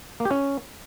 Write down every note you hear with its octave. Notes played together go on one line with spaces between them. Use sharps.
A#3
G4
C#4